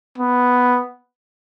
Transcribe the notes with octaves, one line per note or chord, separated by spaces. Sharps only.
B3